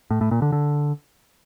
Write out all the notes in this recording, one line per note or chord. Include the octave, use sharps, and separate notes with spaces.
A2
A2
A#2
D3
D3